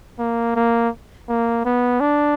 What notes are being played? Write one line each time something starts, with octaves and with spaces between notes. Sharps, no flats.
A#3
A#3
A#3
B3
D4